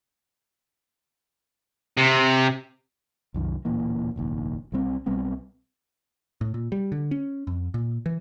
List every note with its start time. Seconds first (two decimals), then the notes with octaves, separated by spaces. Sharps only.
1.97 C3
3.34 C2 F#2 D#3
3.65 D1 A#2 E3 A#3
4.16 F1 A#1 D#2
4.72 B1 G3 C4
5.06 B1 G3 B3 C4
6.41 A2
6.54 A#2
6.72 G3
6.92 D3
7.11 C#4
7.47 F2
7.74 A#2
8.06 E3